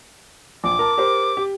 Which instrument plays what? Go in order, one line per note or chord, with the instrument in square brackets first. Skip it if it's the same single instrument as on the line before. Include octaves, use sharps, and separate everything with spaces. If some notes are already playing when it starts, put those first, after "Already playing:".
[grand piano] A#1 [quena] D6
[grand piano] A#4 A5
G4 A#4 C5
G4